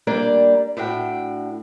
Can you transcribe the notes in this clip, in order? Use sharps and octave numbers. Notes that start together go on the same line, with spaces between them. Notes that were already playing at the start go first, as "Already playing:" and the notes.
G3 A#3 D4 D5
A2 D4 F#4 G5